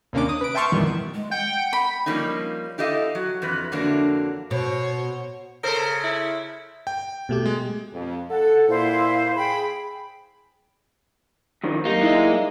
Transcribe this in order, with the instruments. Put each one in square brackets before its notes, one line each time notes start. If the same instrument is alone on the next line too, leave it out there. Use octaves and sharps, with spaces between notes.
[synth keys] D#2 C3 A#3 C#4 D4 D6
D#6
B4 D7
E5 G5 A5 C6 C#6 F6
F2 A#2 D#3 E3 G3 B3
[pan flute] G#3
[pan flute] F#5 [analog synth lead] G5
[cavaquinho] B5
[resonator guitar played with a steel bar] F3 G3 A#3 C#4 D#4
E4 G4 A4 D#5 F5
F#3
F2 E3 B4
F2 D3 E3 F#3 A#3 D4
[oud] B2 [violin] C5 C#5
[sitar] C#3 A4 C5 [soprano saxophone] A#4
[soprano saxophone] E4
[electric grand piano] G5
[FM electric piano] B2 A3 G4
[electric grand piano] G#3
[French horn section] F2
[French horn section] A4 [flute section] F#5
[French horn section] A#2 [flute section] E4 C5 F5
[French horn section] G#4 [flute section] G5 B5
[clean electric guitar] F#2 D#3 F3
[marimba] F#3 G4 [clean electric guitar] A#3 [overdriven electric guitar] D#4
[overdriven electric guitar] G#3 D#5 [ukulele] D#4 E4 D5